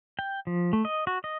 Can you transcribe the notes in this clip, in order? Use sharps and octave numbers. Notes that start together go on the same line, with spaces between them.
G5
F3
A3
D#5
F#4
D#5